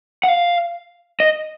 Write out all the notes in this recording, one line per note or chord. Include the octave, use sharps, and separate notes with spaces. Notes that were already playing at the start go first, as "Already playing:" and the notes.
F#5
F5
D#5